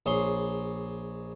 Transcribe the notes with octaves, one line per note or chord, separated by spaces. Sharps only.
A#1 G#4 C#5 C6